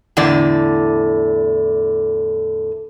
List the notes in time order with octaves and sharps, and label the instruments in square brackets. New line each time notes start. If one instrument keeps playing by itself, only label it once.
[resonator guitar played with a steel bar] E2 A2 D3 D5